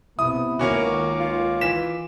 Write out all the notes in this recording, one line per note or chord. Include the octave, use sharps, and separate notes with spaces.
C3 B3 E4 D#6
C#2 D#3 A#3 C#4 F#4 D6
F4
E3 B6 E7